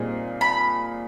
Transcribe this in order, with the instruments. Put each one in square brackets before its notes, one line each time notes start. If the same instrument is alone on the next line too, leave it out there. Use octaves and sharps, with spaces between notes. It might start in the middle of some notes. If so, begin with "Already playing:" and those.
Already playing: [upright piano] A#2 G3 C4 D#4 G#4
[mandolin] B5